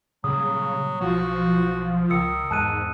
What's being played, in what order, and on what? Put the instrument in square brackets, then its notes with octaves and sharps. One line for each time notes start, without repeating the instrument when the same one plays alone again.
[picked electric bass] A#2 G3 [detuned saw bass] C#3 [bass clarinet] F#3 [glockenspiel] D#6
[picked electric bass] B1 [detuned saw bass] F3 [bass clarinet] F#4
[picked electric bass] C#2 [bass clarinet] D#3 [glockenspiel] D#6 E6 C#7
[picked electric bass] E2 [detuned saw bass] G#2 [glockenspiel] A5 F#6 D#7